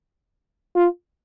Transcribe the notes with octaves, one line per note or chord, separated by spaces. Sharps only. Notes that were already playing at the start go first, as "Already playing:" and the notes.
F4